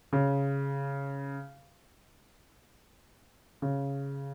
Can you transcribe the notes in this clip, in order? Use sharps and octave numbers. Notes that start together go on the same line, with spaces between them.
C#3
C#3